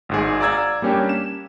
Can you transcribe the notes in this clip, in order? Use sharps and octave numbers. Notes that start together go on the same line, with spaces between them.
G#1 G#2 G#4
D5 F5 A#5 E6 G#6
G3 A#3 C#4 D4 G4
E7